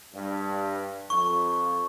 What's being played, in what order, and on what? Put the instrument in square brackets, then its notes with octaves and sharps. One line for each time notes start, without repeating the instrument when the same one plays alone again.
[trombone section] G2
[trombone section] F2 [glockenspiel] C#6